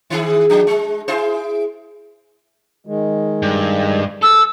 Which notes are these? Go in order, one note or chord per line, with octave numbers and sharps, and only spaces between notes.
D#3 E4 G#4
F3 D4
G#3
E4 G#4 C5
D#3 G#3
G2
A4 E6